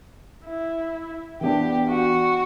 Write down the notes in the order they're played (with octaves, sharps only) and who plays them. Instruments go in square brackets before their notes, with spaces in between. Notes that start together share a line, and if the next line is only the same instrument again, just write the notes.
[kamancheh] E4
[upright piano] E3 B3 D4 [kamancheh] G4
[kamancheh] F#4